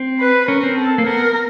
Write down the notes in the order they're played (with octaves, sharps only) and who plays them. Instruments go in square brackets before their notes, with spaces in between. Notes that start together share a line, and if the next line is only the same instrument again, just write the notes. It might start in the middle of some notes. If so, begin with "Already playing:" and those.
Already playing: [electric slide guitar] C4
[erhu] B4
[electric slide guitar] C#4 [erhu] A#4
[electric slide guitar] C4
[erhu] A4
[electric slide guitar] A#3
[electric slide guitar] B3 [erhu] A#4